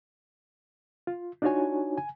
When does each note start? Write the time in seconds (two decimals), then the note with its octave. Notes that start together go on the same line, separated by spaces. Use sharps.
1.07 F4
1.42 D4 D#4 F4 F#4 C#5 G#5
1.97 G#5